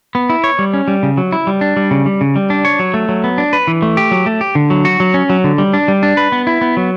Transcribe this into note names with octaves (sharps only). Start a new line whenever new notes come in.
B3
E4
C#5
G3
C#4
G3
C#3
F#3
E4
G3
D4
G3
C#3
G3
C#3
G3
D4
C#5
F#3
A3
F#3
B3
D4
B4
E3
A3
G4
F#3
A3
G4
D3
F#3
F#4
F#3
C#4
F#3
D3
G3
D4
G3
D4
B4
B3
E4
B3
F#3